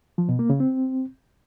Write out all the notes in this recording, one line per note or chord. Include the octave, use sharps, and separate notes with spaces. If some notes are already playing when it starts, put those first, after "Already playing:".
F3
B2
A#3
C#3
C4